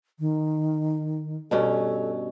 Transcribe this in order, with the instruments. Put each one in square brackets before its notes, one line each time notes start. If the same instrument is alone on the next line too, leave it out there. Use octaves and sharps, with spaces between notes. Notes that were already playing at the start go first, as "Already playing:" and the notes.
[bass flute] D#3
[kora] G2 B2 C#4 [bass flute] A4